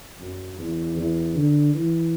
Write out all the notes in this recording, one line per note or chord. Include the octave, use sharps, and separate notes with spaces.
F#2
E2
E2
D3
E3